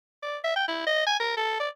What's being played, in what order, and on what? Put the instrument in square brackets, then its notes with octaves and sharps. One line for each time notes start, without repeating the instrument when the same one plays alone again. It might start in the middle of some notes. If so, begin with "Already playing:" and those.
[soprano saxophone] D5
E5
G5
E4
D#5
G#5
A#4
A4
D5